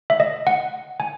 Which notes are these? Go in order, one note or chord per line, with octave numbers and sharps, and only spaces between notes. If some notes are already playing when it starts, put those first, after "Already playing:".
E5
D#5
F#5
G#5